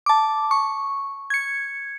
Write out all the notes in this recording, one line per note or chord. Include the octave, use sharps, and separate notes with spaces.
A5 D6
C#6
G#6 C#7